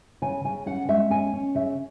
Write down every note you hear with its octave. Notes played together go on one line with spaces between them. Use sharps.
C#3 G#5
C#3 G#5
C#4 F#5
G#3 E5
C#4 G#5
C#4
C#3 E5